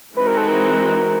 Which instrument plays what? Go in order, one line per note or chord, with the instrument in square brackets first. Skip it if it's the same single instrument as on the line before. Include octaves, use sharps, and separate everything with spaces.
[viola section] E3 G#3 C4 D#4 F#4 [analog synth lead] B4
[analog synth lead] A#4
A4
A#4